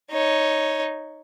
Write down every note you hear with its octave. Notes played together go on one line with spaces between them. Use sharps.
D#4 C#5